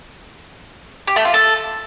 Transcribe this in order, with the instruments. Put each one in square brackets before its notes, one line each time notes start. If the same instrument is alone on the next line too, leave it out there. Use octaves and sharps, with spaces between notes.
[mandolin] G4
A3
F4
A4